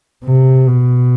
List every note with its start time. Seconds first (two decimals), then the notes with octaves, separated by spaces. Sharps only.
0.25 C3
0.67 B2